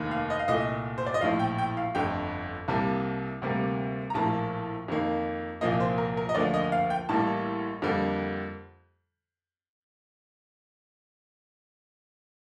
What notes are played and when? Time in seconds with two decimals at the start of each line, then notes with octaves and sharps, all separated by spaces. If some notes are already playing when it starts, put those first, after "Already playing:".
Already playing: F1 D#2 D#3 A#3
0.11 F5
0.30 D#5
0.39 F5
0.48 C2 A#2 A3 D#5
0.98 C5
1.06 D5
1.14 D#5
1.21 A#1 A2 F3 F5
1.39 G5
1.58 G5
1.77 F5
1.95 G1 F2 D3 A3 G5
2.68 C2 C3 G3 A#3 A5
3.42 D2 C3 G3 A#3
4.10 A#5
4.14 A#1 A2 F3 A#3 A5
4.88 F2 D#3 A#3
5.61 C2 A#2 F3 A#3 D#5
5.80 C5
5.98 A#4
6.17 A#4
6.29 D#5
6.35 D2 D3 F3 A#3 D5
6.54 D#5
6.72 F5
6.90 G5
7.09 A1 A2 G3 A#3 A5
7.82 F2 D3 G3 A#3